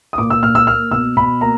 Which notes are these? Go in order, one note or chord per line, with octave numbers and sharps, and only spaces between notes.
D#6
A#2 D6
E6
A#2 F6
E6
A#3 F6
B2 E6
B2 B5
A#3 A#5